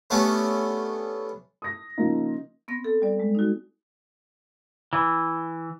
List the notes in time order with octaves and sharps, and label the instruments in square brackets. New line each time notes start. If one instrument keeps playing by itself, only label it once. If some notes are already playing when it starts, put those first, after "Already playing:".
[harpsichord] A3 B3 C#4 D4 G4
[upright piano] D#6 A#6
C#3 F3 A#3 D#4 F4
[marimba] B3 C4 A#6
A4
G3 D5
G#3
D#4 F#4
[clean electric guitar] E3